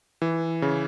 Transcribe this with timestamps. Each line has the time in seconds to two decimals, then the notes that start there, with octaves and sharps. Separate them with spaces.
0.22 E3
0.62 C#3